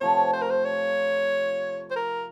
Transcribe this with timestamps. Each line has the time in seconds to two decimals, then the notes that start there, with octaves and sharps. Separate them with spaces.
0.01 C3 F3 A3 C#5
0.34 C5
0.42 A#4
0.50 C5
0.65 C#5
1.91 C5
1.96 A#4